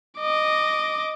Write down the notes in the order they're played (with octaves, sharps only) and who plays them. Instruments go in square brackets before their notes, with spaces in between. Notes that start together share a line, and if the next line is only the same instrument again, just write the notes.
[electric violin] D#5 D6